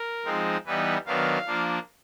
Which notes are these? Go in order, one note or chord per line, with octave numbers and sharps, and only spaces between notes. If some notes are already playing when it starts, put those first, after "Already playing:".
Already playing: A#4
F3 G#3 C4 D#4
E3 G3 B3 D#4 B4
D#3 F#3 B3 D4 F5
F3 A#3 D4